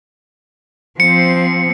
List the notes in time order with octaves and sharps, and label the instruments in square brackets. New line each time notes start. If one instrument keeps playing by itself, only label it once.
[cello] F3 C4 [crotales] C#7